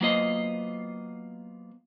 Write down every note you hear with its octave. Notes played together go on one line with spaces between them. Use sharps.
F#3 A#3 B3 F4 C5 D#5